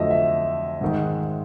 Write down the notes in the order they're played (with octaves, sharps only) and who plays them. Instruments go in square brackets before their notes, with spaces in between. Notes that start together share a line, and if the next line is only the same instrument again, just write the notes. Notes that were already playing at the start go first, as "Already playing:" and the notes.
Already playing: [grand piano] F2 D3 F#3 A3 D#5 E5
E5
G#2 D#3 G#3